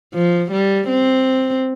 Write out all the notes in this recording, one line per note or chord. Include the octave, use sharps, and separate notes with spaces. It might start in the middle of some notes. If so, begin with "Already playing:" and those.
F3
G3
C4